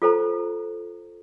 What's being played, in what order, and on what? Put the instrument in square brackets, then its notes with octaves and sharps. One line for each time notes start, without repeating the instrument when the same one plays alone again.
[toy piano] F4 A4 C5 A#5